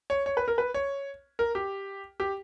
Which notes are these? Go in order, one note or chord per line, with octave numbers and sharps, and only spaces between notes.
C#5
C#5
B4
A#4
B4
C#5
A#4
G4
G4